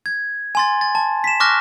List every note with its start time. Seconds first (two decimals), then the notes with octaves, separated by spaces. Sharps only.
0.06 G#6
0.55 G#5 C6 A6
0.81 A6
0.95 A5
1.24 B6 E7
1.40 C#6 D6 F6 F#6 A#6